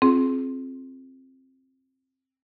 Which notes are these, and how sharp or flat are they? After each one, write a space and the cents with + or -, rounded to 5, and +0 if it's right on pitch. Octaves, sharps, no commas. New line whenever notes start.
C4 +15 F4 -5 G#4 +30